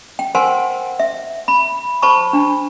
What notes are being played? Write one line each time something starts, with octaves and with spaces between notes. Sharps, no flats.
G5
A#4 C5 F#5 G#5 C6
E5
B5
C5 A5 B5 C#6
D4